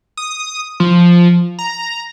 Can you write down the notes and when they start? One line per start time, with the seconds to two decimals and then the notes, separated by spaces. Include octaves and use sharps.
0.17 D#6
0.80 F3
1.59 A#5